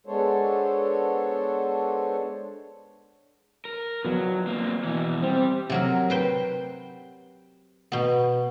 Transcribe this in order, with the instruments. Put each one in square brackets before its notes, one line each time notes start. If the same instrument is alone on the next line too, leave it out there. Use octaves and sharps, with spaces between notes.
[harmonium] G#3 B3 D4 A4 C5 C#5
[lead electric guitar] A#4
[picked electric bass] F3 B3 [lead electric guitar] F#3
[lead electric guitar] A#3 C4
B2 E3
[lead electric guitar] G3 [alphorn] C4
[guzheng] C3 F#3 A#4
B4 C5 G5
B2 B3